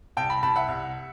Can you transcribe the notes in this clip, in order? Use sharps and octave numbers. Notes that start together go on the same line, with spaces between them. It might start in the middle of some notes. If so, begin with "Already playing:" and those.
C2 G5 A5
A5 B5
C2 A5 B5
E5 F#5
C2